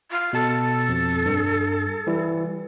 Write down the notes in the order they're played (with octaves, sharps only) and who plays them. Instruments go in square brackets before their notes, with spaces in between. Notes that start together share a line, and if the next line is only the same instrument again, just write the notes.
[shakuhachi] F4
[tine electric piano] B2 A5 [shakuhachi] A4
[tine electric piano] F2
G2
E3 G3 E4